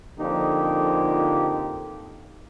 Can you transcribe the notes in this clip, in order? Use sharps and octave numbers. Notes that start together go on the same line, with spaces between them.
F2 D3 F3 A#3 D#4 G4